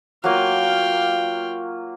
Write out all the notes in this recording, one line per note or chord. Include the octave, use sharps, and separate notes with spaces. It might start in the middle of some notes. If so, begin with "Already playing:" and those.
F#3 A#3 F4 F5 G5